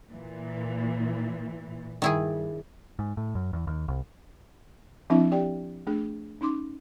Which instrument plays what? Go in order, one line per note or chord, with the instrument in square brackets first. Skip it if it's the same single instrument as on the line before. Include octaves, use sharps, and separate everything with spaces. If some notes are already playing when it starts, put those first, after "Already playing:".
[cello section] A#2 E3
[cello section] G2 [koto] D#3 E4 G#4
[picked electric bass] G#2
A2
F#2
E2
D#2
C2
[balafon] F3 C4 D4 E4 E5
G4 D5 G5
A3 D4 G#4
C#4 D#4 C6 D6